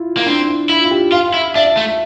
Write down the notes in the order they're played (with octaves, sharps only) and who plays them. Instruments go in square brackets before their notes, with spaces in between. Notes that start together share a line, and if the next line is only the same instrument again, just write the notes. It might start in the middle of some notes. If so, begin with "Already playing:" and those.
Already playing: [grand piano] E4 F4
[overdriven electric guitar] A#3
[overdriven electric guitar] C4 [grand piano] D4
[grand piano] E4
[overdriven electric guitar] E4 [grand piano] F4
[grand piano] F4
G4
[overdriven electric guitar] F4 [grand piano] F5
[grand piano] F5
[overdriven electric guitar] E4
[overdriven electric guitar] D4 [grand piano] E5
[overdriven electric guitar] A3